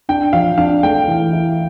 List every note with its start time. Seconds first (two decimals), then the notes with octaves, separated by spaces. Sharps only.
0.09 D4 G5
0.33 F3 F5
0.58 D4 F5
0.83 A3 G5
1.08 E3
1.33 E4